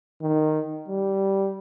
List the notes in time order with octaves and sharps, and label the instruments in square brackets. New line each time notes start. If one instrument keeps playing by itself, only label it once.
[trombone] D#3
G3